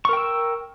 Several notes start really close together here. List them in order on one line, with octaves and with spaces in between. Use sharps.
C#6 A#4 G5 E6